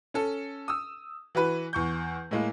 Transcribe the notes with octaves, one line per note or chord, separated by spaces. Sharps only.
C#4 A4
D#6 E6
E3 F#4 B4
E2 C#6 G6
A2 G#3 A#3